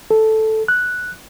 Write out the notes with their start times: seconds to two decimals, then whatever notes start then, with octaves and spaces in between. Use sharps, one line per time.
0.11 A4
0.68 F#6